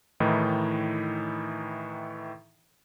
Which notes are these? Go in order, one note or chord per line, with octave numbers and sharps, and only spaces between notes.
A2 D#3 E3 D#4 E4